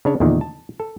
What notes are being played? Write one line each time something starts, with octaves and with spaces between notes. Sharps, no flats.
C#3 D4 C#5
E2 A#2 D3 D#3
A5
A4